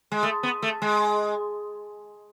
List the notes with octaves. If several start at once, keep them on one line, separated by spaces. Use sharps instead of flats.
G#3
A3
B3
A3
G#3